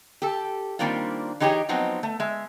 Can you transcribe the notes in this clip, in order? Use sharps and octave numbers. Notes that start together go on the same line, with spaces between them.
G4 A4
D#3 G3 A#3 C4 D4 F4
E3 D#4 G4 G#4 B4 C#5
F3 F#3 B3 C4 D#4
A3
G#3 E5